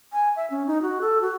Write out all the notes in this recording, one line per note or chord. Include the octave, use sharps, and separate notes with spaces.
G#5
E5
C#4
D#4
F#4
A4
F#4